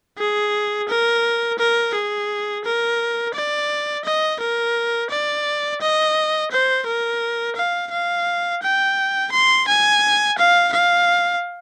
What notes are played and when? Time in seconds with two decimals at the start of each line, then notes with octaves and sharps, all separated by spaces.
0.18 G#4
0.89 A#4
1.59 A#4
1.94 G#4
2.65 A#4
3.34 D5
4.05 D#5
4.40 A#4
5.10 D5
5.81 D#5
6.51 C5
6.86 A#4
7.57 F5
7.91 F5
8.63 G5
9.32 C6
9.68 G#5
10.38 F5
10.73 F5